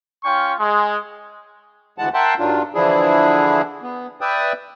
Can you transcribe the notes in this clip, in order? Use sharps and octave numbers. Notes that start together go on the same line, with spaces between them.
C#4 F4 G5 C#6
G#3
D2 E3 G#3 F#5 A5
A#4 E5 F#5 G5 A5 C6
G2 D#3 F#3 D4 F4
D3 E3 F3 D4 E4 G#4
B3
B4 D5 E5 G5 D#6